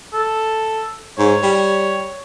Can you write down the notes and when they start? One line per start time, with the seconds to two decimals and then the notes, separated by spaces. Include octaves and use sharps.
0.14 A4
1.18 G#2 C#5
1.43 G3